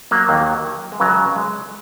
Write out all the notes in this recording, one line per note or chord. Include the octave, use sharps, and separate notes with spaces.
F#3 A#3
D#2 D#3
G#3
C#2 C#3 F#3
G#3